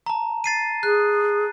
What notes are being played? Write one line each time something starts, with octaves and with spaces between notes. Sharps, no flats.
A5 A#5
A6 C7 D#7
G#4 F#6